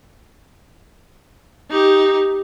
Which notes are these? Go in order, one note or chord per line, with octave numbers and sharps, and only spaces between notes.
D#4 G4